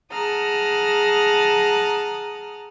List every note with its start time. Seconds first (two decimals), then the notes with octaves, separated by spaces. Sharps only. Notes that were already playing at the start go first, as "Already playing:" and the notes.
0.11 G#4 F#5 A5 A#5 D#6 F6